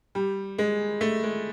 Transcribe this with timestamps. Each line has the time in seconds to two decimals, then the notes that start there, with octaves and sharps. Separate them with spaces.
0.15 G3
0.58 G#3
1.01 A3
1.23 G#3